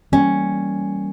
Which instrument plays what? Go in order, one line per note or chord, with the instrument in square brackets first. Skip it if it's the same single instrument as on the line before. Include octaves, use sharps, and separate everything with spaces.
[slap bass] E3 G3 A#3 [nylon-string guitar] C#4